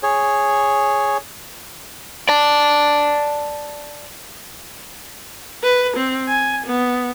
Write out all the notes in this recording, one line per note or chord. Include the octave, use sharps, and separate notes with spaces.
G#4 C#5
D5 A5
B4
C4
G#5
B3